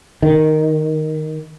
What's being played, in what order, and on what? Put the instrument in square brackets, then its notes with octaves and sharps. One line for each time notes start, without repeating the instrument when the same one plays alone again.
[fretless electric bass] D#3